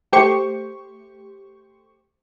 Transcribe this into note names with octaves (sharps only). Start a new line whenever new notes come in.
A3 G4 C5 C#6